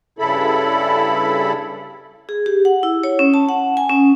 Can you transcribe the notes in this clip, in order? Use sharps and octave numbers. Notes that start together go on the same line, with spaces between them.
G2 C#3 E4 A4 B5
G#4
G4
F#5
E4
C#5
C#4
A5
F#5
G#5
C#4